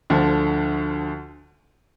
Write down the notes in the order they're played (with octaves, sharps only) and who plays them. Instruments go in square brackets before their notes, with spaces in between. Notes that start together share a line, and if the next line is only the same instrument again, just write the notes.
[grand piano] D2 D3 F3